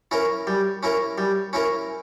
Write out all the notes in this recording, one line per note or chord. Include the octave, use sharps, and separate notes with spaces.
C#4 E4 A#4
G3
C#4 E4 A#4
G3
C#4 E4 A#4